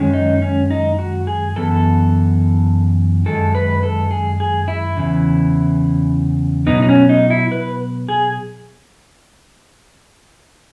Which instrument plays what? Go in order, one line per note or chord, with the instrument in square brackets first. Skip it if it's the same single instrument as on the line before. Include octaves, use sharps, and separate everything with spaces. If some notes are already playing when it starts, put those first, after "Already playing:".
Already playing: [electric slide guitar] F#2 D#3 G#3 C#4
D#4
C#4
D#4
F#4
G#4
F#2 E3 B3 A4
F#2 D#3 G#3 A4
B4
A4
G#4
G#4
E4
E2 C#3 E3
B2 F#3 B3 D#4
D#4
C#4
D#4
E4
B4
G#4